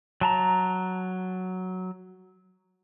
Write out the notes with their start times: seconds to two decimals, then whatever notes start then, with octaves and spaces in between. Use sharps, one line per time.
0.21 F#3 A5 A#5